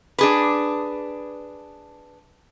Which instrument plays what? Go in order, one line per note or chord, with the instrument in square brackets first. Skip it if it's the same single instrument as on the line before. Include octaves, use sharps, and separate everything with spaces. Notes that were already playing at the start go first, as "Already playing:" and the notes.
[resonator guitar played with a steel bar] D4 G#4 B4